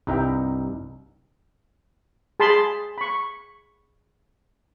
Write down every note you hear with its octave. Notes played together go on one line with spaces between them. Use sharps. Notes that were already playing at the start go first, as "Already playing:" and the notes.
C2 G2 D#4 D#5 E5 G5
G#4 A5 B5 C6
B5 C#6